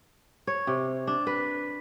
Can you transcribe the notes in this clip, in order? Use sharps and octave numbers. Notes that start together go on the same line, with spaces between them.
C#5
C3
D4
B4